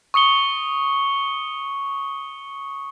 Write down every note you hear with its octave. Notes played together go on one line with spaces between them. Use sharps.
C#6 D#6 C#7 G7